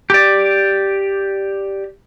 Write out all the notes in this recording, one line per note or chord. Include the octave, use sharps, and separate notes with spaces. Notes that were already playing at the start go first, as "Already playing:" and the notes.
G4 D5